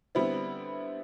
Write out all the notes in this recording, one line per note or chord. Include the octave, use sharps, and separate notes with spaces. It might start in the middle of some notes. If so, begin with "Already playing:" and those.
D3 G3 B3 C4 E4